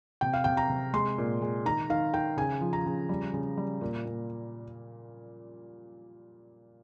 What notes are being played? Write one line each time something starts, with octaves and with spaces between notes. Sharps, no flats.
C3 G5
F5
C3 G5
A#5
C3
G#3 C6
A#2
G#3
D#3 A#5
D#3 F5
D#3 G5
C#3 G#5
F3
A#5
C#3
G3
C#3
G3
A#2
A#2